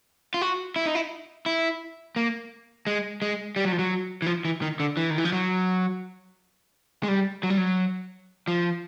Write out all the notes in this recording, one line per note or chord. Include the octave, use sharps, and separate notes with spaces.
F4
F#4
E4
D#4
E4
E4
A#3
G#3
G#3
G3
F#3
F3
F#3
E3
F3
E3
D#3
D3
E3
D#3
E3
F3
F#3
G#3
G3
F#3
G3
F#3
F3